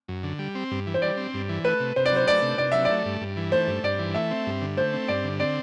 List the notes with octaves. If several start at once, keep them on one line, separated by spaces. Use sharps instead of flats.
F#2
D3
G3
C4
G2
E3
C5
G3 D5
C4
G2
E3
A3 B4
C3
C3 C5
D5
F#3 C5
A3 D5
C3
C3 D5
F#3 E5
D5
A3
G2
G2
E3
A3 C5
G2
G2 D5
E3
A3 E5
C4
G2
D3
A3 C5
C4
G2 D5
D3
C4 D5